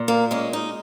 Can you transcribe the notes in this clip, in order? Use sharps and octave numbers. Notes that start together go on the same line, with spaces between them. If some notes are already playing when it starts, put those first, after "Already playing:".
Already playing: A#2
A#3
G#3 C#4
D#4